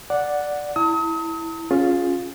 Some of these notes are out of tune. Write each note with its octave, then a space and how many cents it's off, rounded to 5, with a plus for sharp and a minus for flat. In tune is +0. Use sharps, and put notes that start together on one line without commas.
D5 +0 F#5 -5
E4 -5 A5 +45 D#6 +40
C#4 +0 F4 +15 G#4 +0